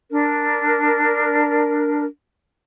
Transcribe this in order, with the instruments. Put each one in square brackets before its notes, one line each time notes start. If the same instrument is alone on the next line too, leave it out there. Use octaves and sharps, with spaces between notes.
[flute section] D4 A#4